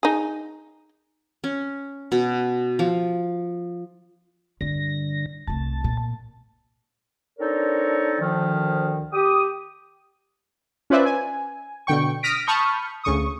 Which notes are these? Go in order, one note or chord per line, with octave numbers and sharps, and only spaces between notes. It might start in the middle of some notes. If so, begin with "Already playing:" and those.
D#4 G#4
C#4
B2
F3
G2 D3 G3 A#6
C2 A3 A5
A#2
C4 D4 D#4 A4 A#4 C#5
D2 D#3 F3
G4 D#6
C#4 F4 B4 C5 D5 E5
G#5
B2 D3 G5 C#6
D#6 F6 A#6 B6 D7
A5 B5 C#6 D#6 F6 G6
D2 C#3 C#6 D#6